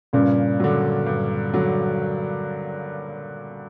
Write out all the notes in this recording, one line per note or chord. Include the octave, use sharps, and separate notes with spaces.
G2 A#2 C#3
D3 F#3
G2
D3 F#3